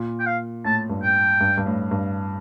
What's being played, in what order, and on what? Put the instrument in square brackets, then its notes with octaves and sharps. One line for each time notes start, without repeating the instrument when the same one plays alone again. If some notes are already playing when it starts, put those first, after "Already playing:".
Already playing: [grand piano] A#2
[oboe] G5
F5
[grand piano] A2 [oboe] A5
[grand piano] G2
[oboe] G5
[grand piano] G2
G2
A2
G2